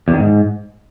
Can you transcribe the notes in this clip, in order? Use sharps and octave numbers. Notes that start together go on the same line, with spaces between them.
E2
D#3
G#2